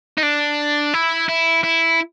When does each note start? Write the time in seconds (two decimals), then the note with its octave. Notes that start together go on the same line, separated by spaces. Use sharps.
0.18 D#4
0.23 D4
0.94 E4
1.29 E4
1.64 E4